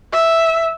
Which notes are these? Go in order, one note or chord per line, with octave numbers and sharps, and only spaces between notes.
E5